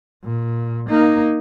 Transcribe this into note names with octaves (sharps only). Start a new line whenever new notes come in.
A#2
A#3 D#4